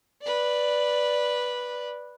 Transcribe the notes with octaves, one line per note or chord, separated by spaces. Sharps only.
B4 D5